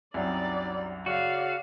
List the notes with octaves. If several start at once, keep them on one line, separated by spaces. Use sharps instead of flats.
C2 F#2 F#3 G3 D#4 D5
C#3 F#4 D5 F5